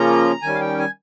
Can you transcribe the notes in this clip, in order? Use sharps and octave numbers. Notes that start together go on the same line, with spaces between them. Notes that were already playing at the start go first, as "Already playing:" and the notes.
Already playing: C#3 F3 A#3 C#4 F4 A#5
D#3 G3 C#4 G#5
F5
G5
G#5